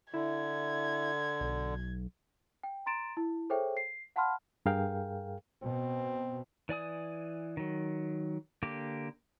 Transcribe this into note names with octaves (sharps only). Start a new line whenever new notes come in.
D3 E4 G#6
B1
G5
A#5 C6 A6 D7 E7
E4
G#4 A4 C5 C#5 E5 G5
C7
F5 F#5 A5 B5 C6 F6
G2 G#4 A#4 F5 G5
B2 C4
E3 D5 G#5 D#6
D#3 F#3
D3 A#3 G4 D6